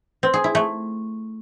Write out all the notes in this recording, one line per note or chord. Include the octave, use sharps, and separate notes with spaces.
C4
G#4
E4
A3